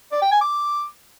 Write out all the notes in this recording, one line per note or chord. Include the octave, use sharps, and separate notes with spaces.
D5
G5
G#5
D6